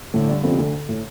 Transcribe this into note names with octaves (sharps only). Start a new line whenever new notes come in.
A2 D3 A3
G2 G3
F2 F3
C3
D2 D3
A2